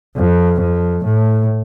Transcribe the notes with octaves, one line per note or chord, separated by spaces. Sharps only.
F2
F2
A2